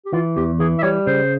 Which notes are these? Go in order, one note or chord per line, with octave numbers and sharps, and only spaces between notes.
G4
E3 F4
E2 G4
E3 G#4
E5
G3 C#5
C#3 C5